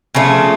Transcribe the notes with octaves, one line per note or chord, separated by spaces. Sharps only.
C#3 F3 A3